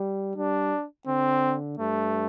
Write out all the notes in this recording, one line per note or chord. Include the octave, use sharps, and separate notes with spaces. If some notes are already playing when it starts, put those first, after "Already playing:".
Already playing: G3
G3 D4
D3 C4
G2 A3